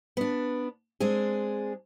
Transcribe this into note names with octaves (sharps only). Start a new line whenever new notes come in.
B3 D4
G#3 C4 D4 G#4